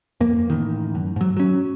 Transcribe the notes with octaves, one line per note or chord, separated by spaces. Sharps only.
F2 A#3
A1 D#3
F#2
G#2 F#3
F#3 C#4